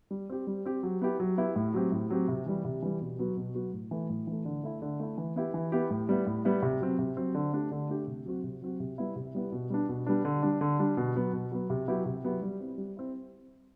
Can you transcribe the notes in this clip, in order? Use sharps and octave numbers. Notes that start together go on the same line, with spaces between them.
G3
C4 G4
G3
C4 G4
F#3
B3 E4 G4
F#3
B3 E4 G4
A2
F#3 C4 G4
A2
F#3 C4 G4
C3
E3 G3
C3
E3 G3
B2
F#3 B3 F#4
B2
F#3 B3 F#4
A2
E3 A3
A2
E3 A3
D3
A3 E4
D3
A3 E4
E3
B3 E4 G4
E3
B3 E4 G4
A2
G3 B3 E4
A2
G3 B3 E4
C3
F#3 C4
C3
F#3 C4
D3
A3 D4 G4
D3
A3 D4 G4
C3
F#3 C4 F#4
C3
F#3 C4 F#4
C3
G3 B3 E4
C3
G3 B3 E4
B2
G3 B3 D4
B2
G3 B3 D4
D3
G3 D4
D3
G3 D4
B2
F#3 B3
B2
F#3 B3
C3
F#3 B3 E4 G4
C3
F#3 B3 E4 G4
G3
C4 E4
G3
C4 E4